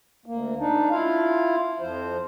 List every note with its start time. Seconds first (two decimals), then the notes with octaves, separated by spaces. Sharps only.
0.26 D2 A#3
0.59 D4 D#4
0.90 E4 F4 F5
1.80 F2 F3 C5